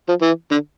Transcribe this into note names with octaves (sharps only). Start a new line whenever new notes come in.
F3
E3
D3